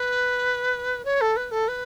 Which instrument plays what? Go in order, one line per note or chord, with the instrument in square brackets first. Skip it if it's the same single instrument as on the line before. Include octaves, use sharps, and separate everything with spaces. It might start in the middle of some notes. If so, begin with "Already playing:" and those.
Already playing: [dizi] B4
C#5
A4
B4
A4
B4